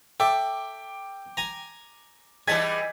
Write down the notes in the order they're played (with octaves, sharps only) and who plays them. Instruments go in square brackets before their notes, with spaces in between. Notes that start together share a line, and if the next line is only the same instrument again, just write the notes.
[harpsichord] A4 E5 [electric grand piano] G5 D6
[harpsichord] G#5 A#5
[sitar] E3 G3 G#3 [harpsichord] G#5 A5 [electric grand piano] G#6 A6 B6